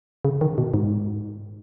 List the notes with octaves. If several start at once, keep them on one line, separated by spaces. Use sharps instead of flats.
C#3
D#3
B2
G#2